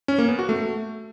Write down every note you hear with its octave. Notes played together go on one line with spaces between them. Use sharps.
C#4
A#3
B3
F#4
A3